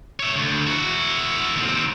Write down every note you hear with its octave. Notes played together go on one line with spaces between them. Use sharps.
C#5 E5
D2
E4 F#4
D#2 C4